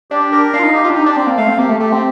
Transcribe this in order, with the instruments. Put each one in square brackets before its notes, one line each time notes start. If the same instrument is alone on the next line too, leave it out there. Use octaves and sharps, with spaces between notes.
[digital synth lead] D4 [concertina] G4
[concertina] A#4
[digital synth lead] D4 [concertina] F5
[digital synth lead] F4
D#4
[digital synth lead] D#4 [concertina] G4
[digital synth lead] F4
D4
[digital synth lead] D#4 [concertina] G4
[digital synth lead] D4
[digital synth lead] C4 [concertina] D5
[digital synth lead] A#3
[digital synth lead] A3 [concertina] F5
[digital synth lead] C4
[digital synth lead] A#3 [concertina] G4
[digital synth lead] A3
[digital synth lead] A3 [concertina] G4
[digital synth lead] C4